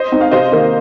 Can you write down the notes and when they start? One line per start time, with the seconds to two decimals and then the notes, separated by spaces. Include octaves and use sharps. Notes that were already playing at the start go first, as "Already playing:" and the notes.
Already playing: C5 D#5
0.12 C4 D#4
0.21 F5
0.31 C3 C5 D#5
0.52 D#3 A#3